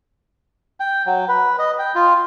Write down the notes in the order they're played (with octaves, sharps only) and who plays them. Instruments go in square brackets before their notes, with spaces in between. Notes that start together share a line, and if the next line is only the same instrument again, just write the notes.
[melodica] G5
F#3
B4
D#5
G5
F4